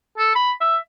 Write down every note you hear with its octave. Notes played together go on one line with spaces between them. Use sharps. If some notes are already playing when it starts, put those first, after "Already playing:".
A4
B5
E5